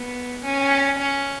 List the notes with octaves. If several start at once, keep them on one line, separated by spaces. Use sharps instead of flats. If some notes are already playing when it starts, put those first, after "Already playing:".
Already playing: B3
C#4
C#4